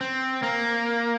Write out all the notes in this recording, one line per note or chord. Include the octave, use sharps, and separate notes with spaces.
C4
A#3